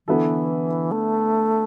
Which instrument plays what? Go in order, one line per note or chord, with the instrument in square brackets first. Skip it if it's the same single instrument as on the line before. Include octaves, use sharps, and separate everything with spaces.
[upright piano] D3 B3 E4 A4 [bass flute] E3
[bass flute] A3